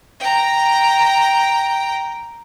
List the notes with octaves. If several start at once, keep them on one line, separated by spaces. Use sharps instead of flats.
G5 A#5